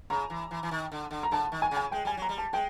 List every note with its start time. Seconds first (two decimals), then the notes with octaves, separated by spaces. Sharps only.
0.10 C#3 A#5
0.30 E3
0.51 E3
0.63 E3
0.71 D#3
0.92 D3
1.11 D3
1.23 A#5
1.31 D3 A5
1.52 D#3
1.62 G#5
1.71 C#3
1.77 G#5
1.92 G#3 G5
2.05 G3 G#5
2.17 F#3 A#5
2.29 G3
2.38 A5
2.53 G#3 G5